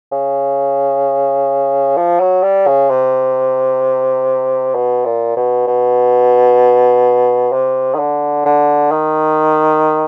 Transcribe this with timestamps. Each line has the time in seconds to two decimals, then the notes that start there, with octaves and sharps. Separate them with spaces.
0.12 C#3
1.97 F3
2.20 F#3
2.43 G3
2.67 C#3
2.90 C3
4.75 B2
5.05 A#2
5.37 B2
5.68 B2
7.52 C3
7.94 D#3
7.99 D3
8.46 D3
8.92 D#3